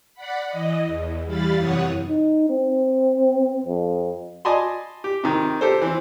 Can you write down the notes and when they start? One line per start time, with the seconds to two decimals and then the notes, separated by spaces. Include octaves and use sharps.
0.14 D5 F#5 B5
0.48 E3 D#5
0.85 E2
1.24 E3 G3 F5 B5 A6
1.56 F#2 C3 E3 C#5 F#5 D#6
2.08 D#4
2.50 C4
3.66 F2
4.45 D5 D#5 G#5 A5 B5 C6
5.04 G4
5.24 C3 D#3
5.61 G4 A4 C5
5.82 E3 C4